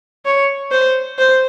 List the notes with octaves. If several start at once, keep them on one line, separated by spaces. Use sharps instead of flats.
C#5
C5
C5